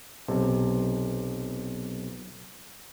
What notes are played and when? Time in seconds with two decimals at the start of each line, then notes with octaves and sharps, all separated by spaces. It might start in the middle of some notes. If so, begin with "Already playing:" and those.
0.28 B1 C3